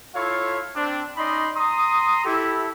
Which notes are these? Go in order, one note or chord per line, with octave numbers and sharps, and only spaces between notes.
E4 F4 A4 C#5 F5
C4 D4
C#4 D#4 D5 D#5 B5 C6
A#5 C6 D#6
E4 G4 A4